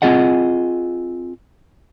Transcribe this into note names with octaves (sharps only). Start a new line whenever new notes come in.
C4 F4 G#4 D#5 F#5